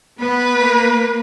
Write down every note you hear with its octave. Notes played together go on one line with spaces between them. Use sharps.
B3 B4
A#3